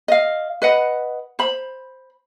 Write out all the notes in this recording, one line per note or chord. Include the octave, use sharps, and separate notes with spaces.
D#5 F5
B4 D#5 F#5
C5 B5